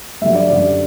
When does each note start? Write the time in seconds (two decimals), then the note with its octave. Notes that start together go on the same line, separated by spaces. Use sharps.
0.21 G2 D3 F#3 E5
0.35 D5
0.50 F#2 D3 G3 D5